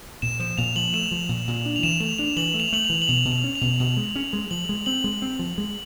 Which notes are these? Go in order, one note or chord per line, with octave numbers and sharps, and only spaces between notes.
A#2 E7
F3 E7
A#2 F7
F3 F#7
A3 E7
F3
A#2
A#2
D4
F7
E3 E7
A3 F7
D4 F7
E3 F#7
A3
F7
A3 F#7
F7
E3
F#7
B2 F7
B2
F7
C#4
F7
B2
B2 F7
G#3
C#4
G#3
F3 F#7
G#3
C4 F#7
G#3
C4
F3
G#3